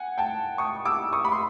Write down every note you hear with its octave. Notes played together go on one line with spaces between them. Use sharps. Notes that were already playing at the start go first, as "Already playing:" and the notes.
Already playing: F#5 G#5
G5 A5
C#6 D#6
D6 E6
C#6 D#6
B5
C6